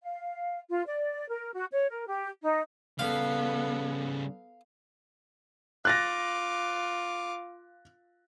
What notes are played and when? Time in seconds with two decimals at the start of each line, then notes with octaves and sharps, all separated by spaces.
0.03 F5
0.70 F4
0.86 D5
1.29 A#4
1.53 F#4
1.72 C#5
1.90 A#4
2.07 G4
2.43 D#4
2.99 C#3 G3 B3 A4 F5
5.85 F4 D6 F#6 A6 A#6